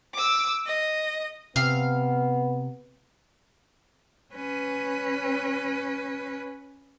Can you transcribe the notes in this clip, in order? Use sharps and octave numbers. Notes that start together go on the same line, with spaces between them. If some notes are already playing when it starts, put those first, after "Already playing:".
D6 E6
D#5
C3 B3 F5
C#4 B4